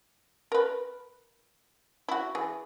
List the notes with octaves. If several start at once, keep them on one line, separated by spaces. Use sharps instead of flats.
A#4 B4
E4 F#4
E3 G#4